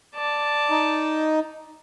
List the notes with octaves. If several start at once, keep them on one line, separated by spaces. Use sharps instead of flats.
D5 A5
D#4